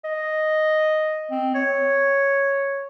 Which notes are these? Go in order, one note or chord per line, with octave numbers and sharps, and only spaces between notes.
D#5
C4
C#5